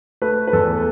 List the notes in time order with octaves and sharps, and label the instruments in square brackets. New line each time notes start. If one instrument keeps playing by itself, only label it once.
[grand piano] A3 B4
B4
E2 A4